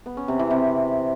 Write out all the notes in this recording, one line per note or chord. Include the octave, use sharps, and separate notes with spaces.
B3
C#4
C3
E3
C3